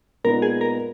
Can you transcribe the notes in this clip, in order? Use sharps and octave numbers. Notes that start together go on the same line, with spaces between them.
A#2 G#3 B3 D#4 A#4
G#4
A#4